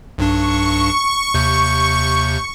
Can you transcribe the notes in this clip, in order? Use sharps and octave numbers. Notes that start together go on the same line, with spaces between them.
B1 G2 D4 C#6
D#2 C3 G6